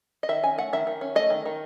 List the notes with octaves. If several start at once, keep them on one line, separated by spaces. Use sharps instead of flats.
D#5
D#3 E5
C#4 G#5
A3 F#5
D#3 E5
D#3
C#4
A3 D#5
D#3
D#3